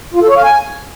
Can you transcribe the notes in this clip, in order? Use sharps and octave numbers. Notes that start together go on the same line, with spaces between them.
F4
A4
C#5
F5
G#5